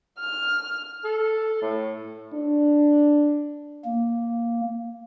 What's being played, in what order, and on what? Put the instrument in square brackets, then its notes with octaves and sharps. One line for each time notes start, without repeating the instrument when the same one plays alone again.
[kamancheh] F6
[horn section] A4
A2
[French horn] D4
[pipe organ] A#3